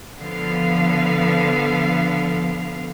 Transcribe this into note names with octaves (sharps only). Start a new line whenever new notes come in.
D3 F3 B3 F5